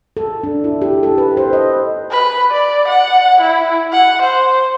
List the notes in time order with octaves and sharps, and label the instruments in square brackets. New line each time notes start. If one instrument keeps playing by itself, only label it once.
[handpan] A4
D4
E4
G4
A4
B4
C5
D#5
[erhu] B4
D5
F#5
E4
F#5
C5